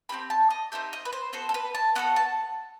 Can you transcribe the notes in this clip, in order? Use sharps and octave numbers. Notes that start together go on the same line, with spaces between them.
C4 D#4 G4 B5
A5
D#5
C4 D#4 G4 E5
D#5
B4
C5
B3 F#4 A4 C5
A4
B4
A5
B3 F#4 A4 F#5
A5